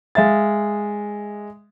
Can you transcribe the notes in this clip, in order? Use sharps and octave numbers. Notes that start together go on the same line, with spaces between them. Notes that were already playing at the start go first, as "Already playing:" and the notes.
G#3 E5 F5 A6